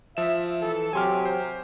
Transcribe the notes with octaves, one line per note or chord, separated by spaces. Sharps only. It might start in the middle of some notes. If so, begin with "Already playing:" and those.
F3 E5 E7
E3 A4
C3 F#3 G4 G#5 C6 F6
C5